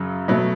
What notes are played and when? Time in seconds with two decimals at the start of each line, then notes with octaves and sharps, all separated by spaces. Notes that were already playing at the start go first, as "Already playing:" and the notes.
Already playing: F#2 C#3 F#3
0.28 B2 F#3 A3